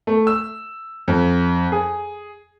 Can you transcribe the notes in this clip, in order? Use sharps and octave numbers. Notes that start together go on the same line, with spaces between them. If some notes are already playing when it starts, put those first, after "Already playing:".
A3
E6
F2
G#4